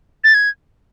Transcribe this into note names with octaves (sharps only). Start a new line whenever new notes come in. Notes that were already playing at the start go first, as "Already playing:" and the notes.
A6
G#6